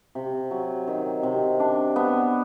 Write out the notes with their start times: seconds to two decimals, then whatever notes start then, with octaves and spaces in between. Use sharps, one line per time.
0.15 C3
0.51 F#3
0.87 D#3
1.23 C3
1.60 D4
1.96 B3